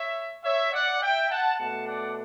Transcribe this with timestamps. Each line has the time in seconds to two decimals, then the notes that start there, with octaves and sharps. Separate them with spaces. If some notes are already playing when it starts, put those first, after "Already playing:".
Already playing: C#5 E5
0.44 C#5 E5
0.73 D5 F#5
1.01 E5 G5
1.30 F#5 A5
1.59 B2 A3 D4 F#5 A5
1.87 D5 F#5